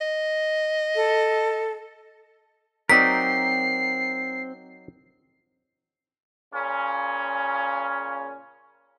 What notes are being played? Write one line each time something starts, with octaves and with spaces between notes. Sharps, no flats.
D#5
A4
F#3 C4 D#4 A#4 D5 B6 C7
A#2 C#3 C#4